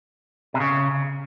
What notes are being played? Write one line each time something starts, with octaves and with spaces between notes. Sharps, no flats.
C3
C#3